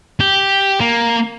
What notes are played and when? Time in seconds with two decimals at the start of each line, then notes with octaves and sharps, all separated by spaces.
0.20 G4
0.80 A#3